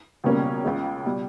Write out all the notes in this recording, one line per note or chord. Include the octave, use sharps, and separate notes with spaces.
C#2 B2 G3 A#3 C#4
C#2 C#3 G#3
B2 G3